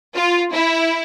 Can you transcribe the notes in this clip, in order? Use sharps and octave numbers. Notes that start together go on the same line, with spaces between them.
F4
E4